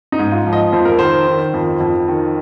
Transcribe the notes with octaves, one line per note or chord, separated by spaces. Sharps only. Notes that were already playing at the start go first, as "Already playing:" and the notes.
D#4
G#2
F4
F3
D#5
F2 C5
A#4
D#3 C5
D#3
F2
F2
D#3